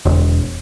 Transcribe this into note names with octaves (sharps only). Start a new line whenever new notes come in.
E1